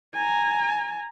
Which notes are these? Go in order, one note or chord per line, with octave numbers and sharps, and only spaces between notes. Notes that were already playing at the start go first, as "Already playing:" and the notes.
G#5 A#5